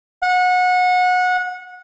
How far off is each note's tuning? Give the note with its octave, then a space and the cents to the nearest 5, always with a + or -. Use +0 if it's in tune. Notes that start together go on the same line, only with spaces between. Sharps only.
F#5 -25